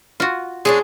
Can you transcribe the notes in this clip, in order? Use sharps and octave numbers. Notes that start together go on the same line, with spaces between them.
F4 F#4
G#3 C#4 D4 G#4